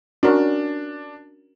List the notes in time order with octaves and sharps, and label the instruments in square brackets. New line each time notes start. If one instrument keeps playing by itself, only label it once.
[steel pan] C#4 F#4 A#4 [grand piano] D4